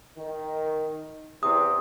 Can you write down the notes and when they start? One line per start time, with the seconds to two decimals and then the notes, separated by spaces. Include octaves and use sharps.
0.16 D#3
1.43 E2 C3 D#6